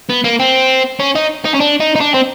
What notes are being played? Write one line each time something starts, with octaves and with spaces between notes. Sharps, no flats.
B3
A#3
C4
C#4
D#4
D#4
C#4
D4
D#4
D#4
D4
C4